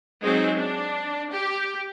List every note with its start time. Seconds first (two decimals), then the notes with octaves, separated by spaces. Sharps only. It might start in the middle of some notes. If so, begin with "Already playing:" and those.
0.22 F#3 G#3 C4 D#4
0.57 D4
1.32 G4